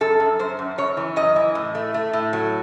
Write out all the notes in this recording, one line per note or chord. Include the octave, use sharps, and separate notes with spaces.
F#2 A4
F#2
F#2 C5
F#2
F#2 C#5
E3
F#2 D#5
E3
A2
A3
A3
A2
F#3